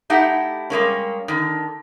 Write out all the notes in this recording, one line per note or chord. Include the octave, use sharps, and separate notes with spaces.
A3 D#4 E4 G4 F#5
G3 G#3 A#3 C#4
D3 D#3